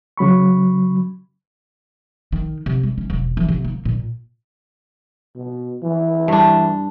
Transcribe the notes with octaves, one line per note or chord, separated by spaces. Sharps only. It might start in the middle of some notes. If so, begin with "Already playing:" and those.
C#3 F#3 B5 C#6
D#3
C3
G#3
C#4
E1
E3
C3
A#3
A#2
B2
E3
G2 D4